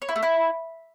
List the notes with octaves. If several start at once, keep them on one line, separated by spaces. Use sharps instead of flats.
C#5
E4
A3
E4